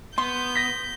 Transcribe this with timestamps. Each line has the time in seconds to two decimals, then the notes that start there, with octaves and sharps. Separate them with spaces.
0.18 B3 C6 G6
0.56 A#6 B6